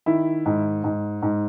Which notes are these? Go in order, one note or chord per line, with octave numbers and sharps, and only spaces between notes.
D#3 E4
G#2
G#2
G#2